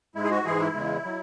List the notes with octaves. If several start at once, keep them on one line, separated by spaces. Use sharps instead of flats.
G#2 G#3 E4
G#4
F#4
G#2 E3 G#3 E4 G#4
E4
E2 C#3 G#3
F#3